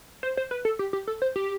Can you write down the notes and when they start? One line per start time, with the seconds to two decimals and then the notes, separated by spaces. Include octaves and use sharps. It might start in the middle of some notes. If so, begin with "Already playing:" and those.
0.23 C5
0.37 C5
0.51 B4
0.65 A4
0.79 G4
0.93 G4
1.08 A4
1.22 C5
1.36 G4